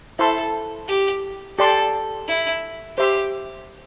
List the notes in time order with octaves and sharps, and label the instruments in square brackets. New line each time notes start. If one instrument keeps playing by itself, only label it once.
[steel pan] E4 C5 E5 A5 C6 [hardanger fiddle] A4
[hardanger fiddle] G4
[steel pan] G4 D5 C6 [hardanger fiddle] A4
[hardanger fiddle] E4
[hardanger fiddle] G4 [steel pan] C5 E5 C6